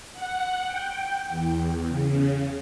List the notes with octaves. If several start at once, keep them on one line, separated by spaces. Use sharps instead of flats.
F#5
G5
E2
C#3